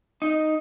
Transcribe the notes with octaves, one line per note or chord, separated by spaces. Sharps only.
D#4